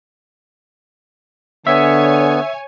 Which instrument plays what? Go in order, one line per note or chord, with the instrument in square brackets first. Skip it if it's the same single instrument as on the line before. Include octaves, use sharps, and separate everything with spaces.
[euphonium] D3 [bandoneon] B3 [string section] C#5 G#5 [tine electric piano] E5